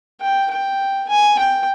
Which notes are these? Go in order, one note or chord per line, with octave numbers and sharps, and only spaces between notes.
G5
G5
G#5
G5